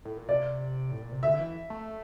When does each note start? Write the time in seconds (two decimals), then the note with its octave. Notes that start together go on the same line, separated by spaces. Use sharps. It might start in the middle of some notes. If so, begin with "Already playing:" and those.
0.05 A2
0.17 A#2
0.28 C3 D5
0.91 A2
1.01 A#2
1.12 C3
1.23 D3 E5
1.39 E3
1.70 A3